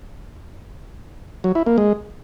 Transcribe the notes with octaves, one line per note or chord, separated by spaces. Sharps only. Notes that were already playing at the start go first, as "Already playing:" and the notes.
F#3
E4
A#3
G#3